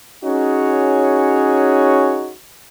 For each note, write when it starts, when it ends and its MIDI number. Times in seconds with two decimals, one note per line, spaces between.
0.25 2.32 61
0.25 2.32 63
0.25 2.32 66
0.25 2.32 68
0.25 2.32 73